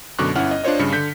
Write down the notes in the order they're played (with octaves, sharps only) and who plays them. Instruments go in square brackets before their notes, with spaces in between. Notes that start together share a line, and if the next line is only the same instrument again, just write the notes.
[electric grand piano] F#2 B2 D3 C#6 D6 F#6
G1 C#4 E4 F#5 F6
D#5
D4 F4 C5 C#5 D#5
G2 C#3 C#7
D3 G6 B6